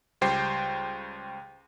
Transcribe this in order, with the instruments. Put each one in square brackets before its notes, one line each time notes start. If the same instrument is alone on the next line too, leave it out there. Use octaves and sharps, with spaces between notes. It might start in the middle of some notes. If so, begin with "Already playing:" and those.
[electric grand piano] C#2 G3 C5 G5 C7